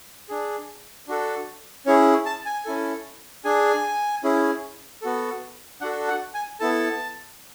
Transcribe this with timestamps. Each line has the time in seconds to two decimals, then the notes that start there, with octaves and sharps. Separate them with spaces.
0.29 D4 G#4
1.08 D4 F#4 A4
1.86 C#4 E4 G#4 C#5
2.26 A5
2.46 G#5
2.65 C#4 E4 A4
3.44 D4 G#4 G#5
4.24 C#4 E4 G#4
5.02 B3 F#4 A4
5.81 D4 F#4 A4 F#5
6.08 F#5
6.34 G#5
6.60 B3 E4 A4 A5